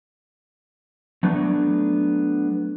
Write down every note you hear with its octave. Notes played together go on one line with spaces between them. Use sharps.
F#3 A3 B3 D4